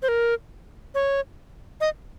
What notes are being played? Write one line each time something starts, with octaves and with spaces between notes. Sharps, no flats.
C5
A#4
C#5
D#5